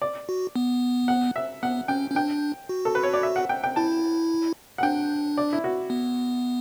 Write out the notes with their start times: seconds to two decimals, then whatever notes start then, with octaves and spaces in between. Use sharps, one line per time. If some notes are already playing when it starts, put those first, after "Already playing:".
0.02 D5
0.29 F#4
0.56 B3
1.08 F#5
1.36 E5
1.63 B3 F#5
1.88 C#4 G5
2.10 C#4
2.15 D4 G5
2.69 F#4
2.85 A4
2.95 B4
3.03 C#5
3.14 D5
3.23 E5
3.36 F#5
3.49 G5
3.64 G5
3.76 E4 A5
4.78 F#5
4.83 D4 G5
5.38 D5
5.53 E4
5.64 F#4
5.90 B3